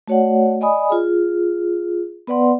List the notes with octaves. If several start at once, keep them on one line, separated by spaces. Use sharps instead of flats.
A3 F#4 C#5 D5 F#5
D5 D#5 G#5 B5 D#6
F4 G#4
B3 B4 D5 F#5 C6